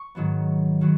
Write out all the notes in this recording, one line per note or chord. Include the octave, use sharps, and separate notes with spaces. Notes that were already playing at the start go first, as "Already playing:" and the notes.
Already playing: C#6
G#2 D#3 F#3 B3
D#3 F#3 B3